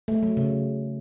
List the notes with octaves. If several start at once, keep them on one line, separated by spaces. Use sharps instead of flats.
A3
F#3
C#3